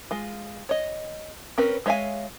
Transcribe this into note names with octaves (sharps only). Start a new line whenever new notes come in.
G#3 F4
C#5 D#5
C4 C#4 A#4 B4
G#3 C#5 E5 F5 G#5